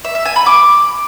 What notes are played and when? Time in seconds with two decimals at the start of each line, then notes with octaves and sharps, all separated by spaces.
0.05 E5
0.15 E5
0.25 G#5
0.36 B5
0.46 D6